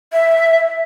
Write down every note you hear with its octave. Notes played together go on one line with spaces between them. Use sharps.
E5